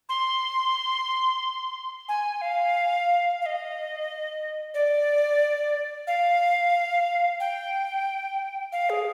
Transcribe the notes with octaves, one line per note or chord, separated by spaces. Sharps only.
C6
G#5
F5
F5
D#5
D5
F5
G5
F5
G#4